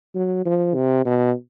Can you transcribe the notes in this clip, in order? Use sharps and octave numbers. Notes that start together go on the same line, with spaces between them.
F#3
F3
C3
B2